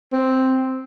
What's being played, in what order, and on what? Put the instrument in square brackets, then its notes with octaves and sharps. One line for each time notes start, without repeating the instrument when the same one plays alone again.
[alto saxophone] C4